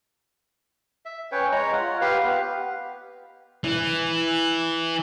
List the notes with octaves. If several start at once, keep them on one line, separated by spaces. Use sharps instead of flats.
E5
C#4 B4 C#5 G5
G#3 C#5 A#5
F4 F#5
G4 B4 F5
B3
E3